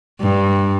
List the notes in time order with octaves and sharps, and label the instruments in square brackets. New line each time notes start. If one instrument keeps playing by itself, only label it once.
[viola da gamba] G2